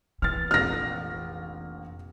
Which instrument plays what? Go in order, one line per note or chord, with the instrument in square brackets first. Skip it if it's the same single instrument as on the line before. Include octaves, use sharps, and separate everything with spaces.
[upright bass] E3 [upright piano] F6 A6
[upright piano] F1 A#1 [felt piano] F6 A#6